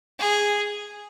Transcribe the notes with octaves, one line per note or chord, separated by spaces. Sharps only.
G#4